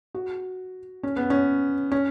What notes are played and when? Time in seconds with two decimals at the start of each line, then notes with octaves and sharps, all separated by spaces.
0.15 F#4
1.03 C#4
1.16 B3
1.30 C#4
1.92 C#4